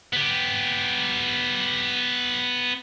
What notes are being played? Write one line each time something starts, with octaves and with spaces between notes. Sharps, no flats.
B3 G4